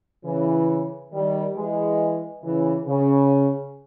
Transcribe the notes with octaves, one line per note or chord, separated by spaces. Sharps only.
C#3 E3
D#3 G3
E3 G#3
C#3 E3
C#3